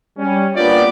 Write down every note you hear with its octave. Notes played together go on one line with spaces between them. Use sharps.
G3 C#4
A#3 B3 D4 F4 G4 D5